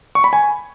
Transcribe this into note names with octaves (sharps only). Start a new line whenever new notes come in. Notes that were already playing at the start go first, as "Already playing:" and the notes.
C#6
B5
G#5